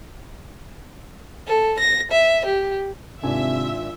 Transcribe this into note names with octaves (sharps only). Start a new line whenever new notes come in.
A4
A#6
E5
G4
G#1 C3 D4 F4 E5 G#5